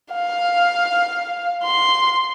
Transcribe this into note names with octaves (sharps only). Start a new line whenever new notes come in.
F5
C6